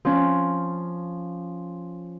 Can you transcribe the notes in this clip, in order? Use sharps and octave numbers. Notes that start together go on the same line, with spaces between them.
F3 C#4